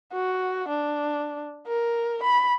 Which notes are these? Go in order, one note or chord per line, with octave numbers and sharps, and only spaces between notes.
F#4
D4
A#4
B5